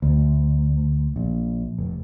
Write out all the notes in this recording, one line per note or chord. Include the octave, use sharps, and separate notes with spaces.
D2
A#1
F1